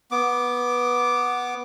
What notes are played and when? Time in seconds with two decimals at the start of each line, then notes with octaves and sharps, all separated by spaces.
0.11 B3 D6